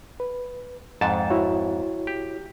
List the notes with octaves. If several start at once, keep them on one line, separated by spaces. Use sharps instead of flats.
B4
F2 G#2 F#5 A5 A6
E4 F#4 C#5
G4